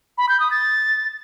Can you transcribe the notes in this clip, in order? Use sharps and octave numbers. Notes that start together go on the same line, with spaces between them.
B5
G6
D#6
A6